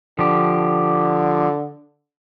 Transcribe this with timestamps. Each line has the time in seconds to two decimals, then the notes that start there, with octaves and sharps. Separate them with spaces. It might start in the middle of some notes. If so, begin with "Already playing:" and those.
0.19 D3 F3 G4